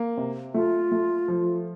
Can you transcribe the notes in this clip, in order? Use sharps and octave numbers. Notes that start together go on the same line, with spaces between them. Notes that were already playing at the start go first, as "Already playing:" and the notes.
Already playing: A#3
C3
A3 F4
A3
F3